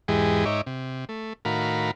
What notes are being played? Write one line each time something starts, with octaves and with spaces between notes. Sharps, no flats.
E2 G#2 E3 G#3 G4 G#4
G#2 D#4 C#5 E5 D6
C3
A3
A2 D#3 F#4 A#4 F5 B5